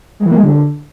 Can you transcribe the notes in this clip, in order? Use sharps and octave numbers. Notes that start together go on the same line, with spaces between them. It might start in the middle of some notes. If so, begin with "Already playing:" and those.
G#3
E3
A#3
G#3
D3